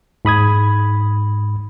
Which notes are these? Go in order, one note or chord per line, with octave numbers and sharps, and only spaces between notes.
G#2 B5 D#6 G#6